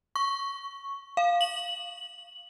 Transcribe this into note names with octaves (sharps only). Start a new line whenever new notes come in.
C#6
F5
F#7